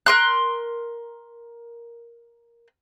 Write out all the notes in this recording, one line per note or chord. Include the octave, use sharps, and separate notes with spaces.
A#4 C6 F#6